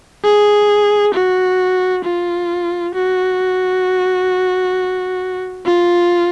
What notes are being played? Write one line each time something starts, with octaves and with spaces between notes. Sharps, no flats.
G#4
F#4
F4
F#4
F4